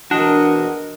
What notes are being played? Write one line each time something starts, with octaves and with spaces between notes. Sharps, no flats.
E2 D4 F#4 A#4 D#5